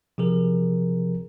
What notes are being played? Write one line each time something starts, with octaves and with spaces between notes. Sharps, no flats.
C3 F3 G#4 A#4